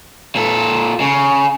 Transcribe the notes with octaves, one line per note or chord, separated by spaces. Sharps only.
A#2 A4
C#3